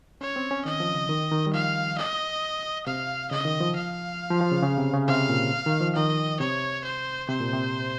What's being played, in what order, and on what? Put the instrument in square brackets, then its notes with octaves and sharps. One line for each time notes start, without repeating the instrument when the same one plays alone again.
[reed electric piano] C#4 [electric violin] C#5
[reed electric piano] C4
C#4
[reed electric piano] D#3 [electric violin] D#5
[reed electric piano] F3
C#3
D#3
D#3
G3
[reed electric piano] F3 [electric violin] F5
[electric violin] D#5
[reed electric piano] C3 [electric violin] F5
[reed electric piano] C#3 [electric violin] D#5
[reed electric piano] D#3
F3
[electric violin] F5
[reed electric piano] F3
F3
C#3
C#3
C3
C#3
[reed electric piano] C3 [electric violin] F5
[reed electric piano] A#2
D#3
F3
[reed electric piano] D#3 [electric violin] D#5
[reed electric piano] C3 [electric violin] C#5
[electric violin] C5
[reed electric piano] C3 [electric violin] C5
[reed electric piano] A#2
C3